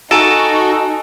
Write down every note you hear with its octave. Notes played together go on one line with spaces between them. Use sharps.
D#4 F#4 A4 G#5 A#5 D7